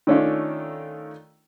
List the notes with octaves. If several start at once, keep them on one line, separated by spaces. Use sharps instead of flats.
D#3 A3 C#4 D4 F4